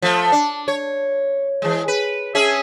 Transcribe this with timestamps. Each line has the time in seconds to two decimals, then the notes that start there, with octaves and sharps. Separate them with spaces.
0.02 F3 A3
0.32 D4
0.68 C#5
1.62 E3 G#3
1.88 B4
2.35 C#4 G#4 E5